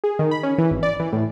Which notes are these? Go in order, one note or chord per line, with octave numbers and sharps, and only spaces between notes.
G#4
D#3
B5
C#4
E3
G#1
D5
E3
A2